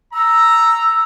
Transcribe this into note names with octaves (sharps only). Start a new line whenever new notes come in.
A#5 E6